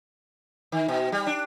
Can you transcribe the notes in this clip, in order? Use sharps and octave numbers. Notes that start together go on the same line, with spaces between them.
D#3
B2
G3
D4